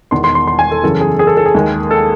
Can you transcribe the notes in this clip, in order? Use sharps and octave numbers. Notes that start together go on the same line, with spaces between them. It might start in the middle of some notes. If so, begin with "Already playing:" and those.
E1 E2 D#3 C6
C6
C6
C6
G#5
A4
F#2 C#3 E3 A4
G#4
G#4
A4
A4
G#4
D#2 D#3 G#3
A4